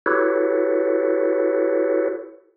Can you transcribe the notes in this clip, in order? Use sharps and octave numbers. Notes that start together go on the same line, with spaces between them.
E4 F#4 G4 A4 B4 C#5